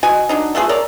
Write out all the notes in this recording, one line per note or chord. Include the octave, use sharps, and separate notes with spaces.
B2 F#4 D#5 G#5
F#3 D4 D#4
A3 B3 F4 G#4
A#4 C#5 D5